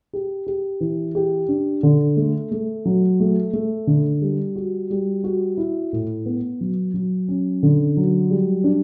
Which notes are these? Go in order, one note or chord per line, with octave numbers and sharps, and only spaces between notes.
G4
G4
E3
G4
D4
D3
A3
A3
F#3
A3
A3
D3
G3
F#4
G3
F#4
E4
A2
B3
F#3
F#3
C#4
D3
F#3
G3
D4